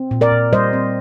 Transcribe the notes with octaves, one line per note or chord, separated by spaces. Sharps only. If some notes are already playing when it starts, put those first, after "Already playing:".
Already playing: C4
A#2
A#4 D5
A#2
G3 C5 D#5
C4